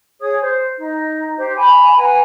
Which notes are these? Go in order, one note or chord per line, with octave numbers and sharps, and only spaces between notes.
G#4 C#5 D#6
C5
D#4
G4 C5
G#5 B5
B4 F#5 G#5 A#5